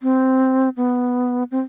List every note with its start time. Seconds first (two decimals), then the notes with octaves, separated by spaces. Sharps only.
0.02 C4
0.77 B3
1.51 C4